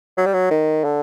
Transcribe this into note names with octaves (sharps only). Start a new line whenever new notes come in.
F#3
G3
F#3
D#3
D3